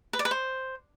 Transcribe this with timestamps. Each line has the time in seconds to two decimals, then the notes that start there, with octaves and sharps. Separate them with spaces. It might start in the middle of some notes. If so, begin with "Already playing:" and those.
0.13 B4
0.19 D5
0.25 B4
0.31 C5